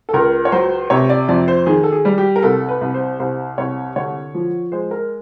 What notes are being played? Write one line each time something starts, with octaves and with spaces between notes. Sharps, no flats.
A4
C#2 A#4
C#5
F#3 C5
C3 C#5
D5
F2 D5
C5
D#3 G#4
A4
G#4
G3
G4
A#4
C2 A4
B4
C2
C5
C2 C5
C2 C#5
D3 C#5
F3
G#3 C5
A#4